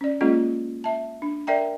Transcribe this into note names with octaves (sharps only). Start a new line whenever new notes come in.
C#4 D5
G#3 A#3 C#4 F4 G#4 D#5
E5 A5
D4
A#4 D5 E5 G5 A#5